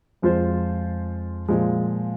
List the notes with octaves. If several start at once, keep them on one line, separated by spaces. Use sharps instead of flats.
F2 F3 G#3 F4 C5
A#2 F3 G#3